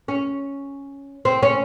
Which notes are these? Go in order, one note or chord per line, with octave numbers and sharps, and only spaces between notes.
C#4
C4
C#4